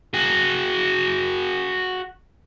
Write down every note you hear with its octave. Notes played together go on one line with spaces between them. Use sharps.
F#4 G#4